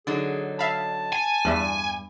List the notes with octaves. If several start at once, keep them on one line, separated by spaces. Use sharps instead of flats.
D3 F#3 D#4 G#4
E5 F5 A5 B5
G#5
E2 G2 G3 E5